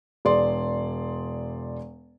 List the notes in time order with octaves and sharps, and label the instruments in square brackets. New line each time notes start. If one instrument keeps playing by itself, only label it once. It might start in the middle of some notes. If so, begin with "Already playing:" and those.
[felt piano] E1 G#4 D5 C6